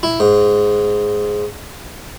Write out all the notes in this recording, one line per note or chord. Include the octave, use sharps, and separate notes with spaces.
E4
G#2